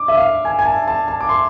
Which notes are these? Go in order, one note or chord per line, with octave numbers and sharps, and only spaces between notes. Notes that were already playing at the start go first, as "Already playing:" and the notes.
Already playing: D6
E5
F5
G#5
G#5
A5
A5
A5
D6
C6